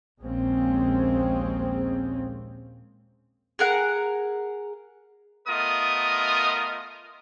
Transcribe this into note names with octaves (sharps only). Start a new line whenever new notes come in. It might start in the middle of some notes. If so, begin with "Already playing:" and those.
A#1 D#2 G#3 A#3 C4 C#4
G#4 A#4 F#5
A3 B3 F4 A#4 D#5 D#6